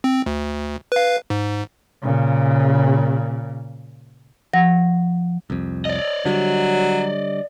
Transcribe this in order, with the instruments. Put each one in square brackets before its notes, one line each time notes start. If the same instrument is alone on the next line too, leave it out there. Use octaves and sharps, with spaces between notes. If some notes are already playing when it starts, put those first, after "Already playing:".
[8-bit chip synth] C4
D2
B4 F5
G#2
[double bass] A#2 C#3
[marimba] F3 F#5 A#6
[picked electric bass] C2 F2
[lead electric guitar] D5 D#5
[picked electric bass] D3 G3 [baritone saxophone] F#3